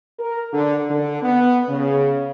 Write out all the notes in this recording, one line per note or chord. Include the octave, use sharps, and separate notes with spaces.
A#4
D3
D3
B3
C#3